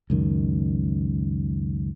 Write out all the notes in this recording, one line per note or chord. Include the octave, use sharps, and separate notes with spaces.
C#2 F#2 D#3